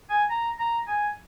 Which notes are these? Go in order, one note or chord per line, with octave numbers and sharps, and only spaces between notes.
G#5
A#5
A#5
G#5